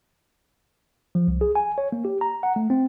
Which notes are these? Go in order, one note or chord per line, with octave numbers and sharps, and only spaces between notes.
F3
C2
G#4
G#5
C#5
A#3
G4
A#5
F#5
A3
C4